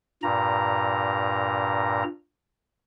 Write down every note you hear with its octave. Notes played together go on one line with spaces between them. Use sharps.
G2 A#2 A#5